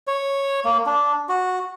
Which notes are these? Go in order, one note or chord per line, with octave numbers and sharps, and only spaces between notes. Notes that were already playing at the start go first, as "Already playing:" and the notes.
C#5
A#3
D4
F#4